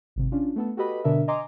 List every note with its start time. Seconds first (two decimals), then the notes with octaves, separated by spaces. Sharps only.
0.16 G#1 C3
0.32 C#4 D4 F4
0.56 A3 B3 A4
0.77 F#4 G4 A4 B4 D#5 B5
1.04 B2 D3 D4 A#4 E5
1.28 D#5 G#5 A#5 C6 D6